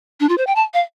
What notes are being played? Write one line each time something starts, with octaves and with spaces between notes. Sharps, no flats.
D4
F4
C5
G5
A5
F5